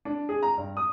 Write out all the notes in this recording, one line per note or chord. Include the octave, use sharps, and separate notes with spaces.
D4
G#4
A#5
G2
D#6